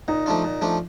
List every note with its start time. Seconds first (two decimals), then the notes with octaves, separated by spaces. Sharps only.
0.08 A#2 D#4
0.26 F3 A3 D4 F4
0.44 A#2
0.62 F3 A3 D4 F4